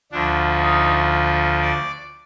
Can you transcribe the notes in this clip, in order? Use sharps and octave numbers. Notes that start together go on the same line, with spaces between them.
D2 D3 F3 D4
D#4
D5